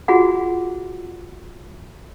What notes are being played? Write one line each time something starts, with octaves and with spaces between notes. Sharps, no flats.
F4 F#4 G#4 F#5 B5